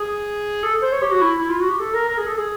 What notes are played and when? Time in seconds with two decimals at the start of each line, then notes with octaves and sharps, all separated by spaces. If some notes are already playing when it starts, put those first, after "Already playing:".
Already playing: G#4
0.63 A4
0.82 C5
0.92 C#5
1.02 G4
1.12 F#4
1.21 E4
1.40 E4
1.50 F4
1.60 F#4
1.69 G4
1.80 A4
1.94 A#4
2.08 A#4
2.18 G#4
2.27 A4
2.38 G#4